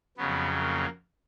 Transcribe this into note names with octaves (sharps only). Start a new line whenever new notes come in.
F2 C#3 F#3 B3
A#3